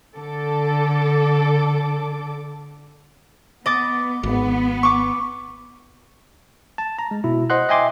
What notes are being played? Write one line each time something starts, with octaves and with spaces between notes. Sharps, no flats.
D3 A4 D6
B3 D#5 D6 A6
G#1 B3
C#6 D6
A5
A#5
G#3
B2 E4
C5 D#5 F#5 C6 F#6
D#5 E5 G5 G#5 C6 D6